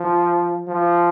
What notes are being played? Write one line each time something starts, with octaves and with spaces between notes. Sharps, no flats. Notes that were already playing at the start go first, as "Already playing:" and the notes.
Already playing: F3
F3